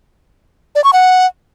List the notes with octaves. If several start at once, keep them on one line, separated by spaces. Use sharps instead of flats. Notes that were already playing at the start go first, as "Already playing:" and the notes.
D5
C#6
F#5